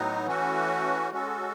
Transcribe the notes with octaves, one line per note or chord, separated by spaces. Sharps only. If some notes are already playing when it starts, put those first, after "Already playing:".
Already playing: A2 F#3 B3 D#4
E3 A3 C#4 F#4
G#3 C#4 F#4 A4